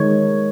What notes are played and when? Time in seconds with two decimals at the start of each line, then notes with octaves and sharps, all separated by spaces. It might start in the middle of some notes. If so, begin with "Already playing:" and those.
Already playing: D#3 G#3 C#5